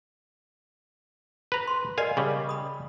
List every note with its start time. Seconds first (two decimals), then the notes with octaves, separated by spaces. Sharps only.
1.52 B4 A#5
1.68 C6
1.98 A#4 D5 D#5 F5 G#5
2.17 C#3 G3
2.49 B5 D#6